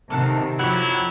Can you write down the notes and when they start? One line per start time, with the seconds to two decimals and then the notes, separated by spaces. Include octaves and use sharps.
0.10 C3 D#3 A4 A#4 F#5
0.59 F2 F3 F#3 E4 G4 F#5